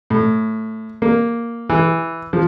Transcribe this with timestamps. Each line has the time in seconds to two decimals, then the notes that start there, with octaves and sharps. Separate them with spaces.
0.10 A2
1.02 A#3
1.70 E3
2.33 F3